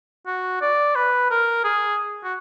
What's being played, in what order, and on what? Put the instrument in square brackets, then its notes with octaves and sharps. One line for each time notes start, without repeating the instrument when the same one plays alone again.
[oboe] F#4
D5
B4
A#4
G#4
F#4